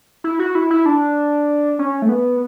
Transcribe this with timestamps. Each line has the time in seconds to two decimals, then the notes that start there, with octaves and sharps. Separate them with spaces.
0.24 E4
0.39 F#4
0.55 E4
0.70 E4
0.86 D4
1.79 C#4
2.02 A3
2.09 B3